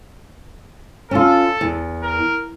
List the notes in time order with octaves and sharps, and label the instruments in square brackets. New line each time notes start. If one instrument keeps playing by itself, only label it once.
[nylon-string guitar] C#4 F4 [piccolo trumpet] A4
[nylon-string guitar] E2
[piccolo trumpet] A#4